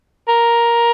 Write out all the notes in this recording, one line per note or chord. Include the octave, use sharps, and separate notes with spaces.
A#4